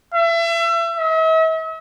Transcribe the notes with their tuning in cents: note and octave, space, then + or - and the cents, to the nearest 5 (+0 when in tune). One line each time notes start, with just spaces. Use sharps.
E5 +30
E5 -45